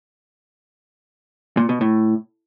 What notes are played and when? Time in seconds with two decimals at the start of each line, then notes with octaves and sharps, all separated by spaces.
1.57 A#2
1.69 B2
1.81 A2